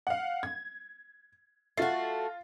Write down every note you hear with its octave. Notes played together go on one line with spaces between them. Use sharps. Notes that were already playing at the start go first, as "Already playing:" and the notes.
F5 F#5
G#6
A3 F4 F#4 A6 C7